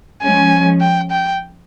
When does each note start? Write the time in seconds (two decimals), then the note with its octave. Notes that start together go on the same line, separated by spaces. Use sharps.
0.23 F3 G#3 C#4 G#5
0.81 G5
1.11 G5